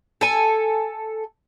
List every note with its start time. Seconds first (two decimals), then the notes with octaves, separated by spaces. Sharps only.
0.21 A4 G#5